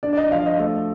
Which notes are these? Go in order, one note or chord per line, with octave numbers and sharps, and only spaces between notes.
D4 D5
D5
D#5
F3 F5
D#5
A3